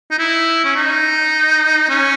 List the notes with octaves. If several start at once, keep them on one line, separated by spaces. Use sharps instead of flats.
D#4
E4
C#4
D#4
C#4